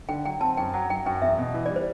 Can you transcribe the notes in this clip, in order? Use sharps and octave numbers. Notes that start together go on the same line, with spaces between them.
D3 G5
F#3 G5
C4 A5
F#2 G5
F#3
F#3 G5
F#2 G5
E2 E5
B2
E3
D5
G3
C5